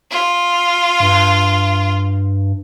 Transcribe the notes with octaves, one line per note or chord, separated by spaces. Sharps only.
F4
G2